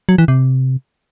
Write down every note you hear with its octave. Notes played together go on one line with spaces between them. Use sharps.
F#3
E3
C3